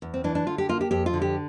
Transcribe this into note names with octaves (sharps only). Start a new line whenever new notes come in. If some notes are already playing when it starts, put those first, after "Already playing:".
E2
C4
E3 D4
D4
D3 F4
G4
A#3 F4
G4
F2 G4
F4
D3
G4